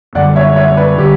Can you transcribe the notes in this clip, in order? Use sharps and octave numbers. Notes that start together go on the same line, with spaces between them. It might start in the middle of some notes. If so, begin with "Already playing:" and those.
F#2 D3 G3 D5 F#5
C#5 E5
C#5 E5
B4 D5
D3 G3 G4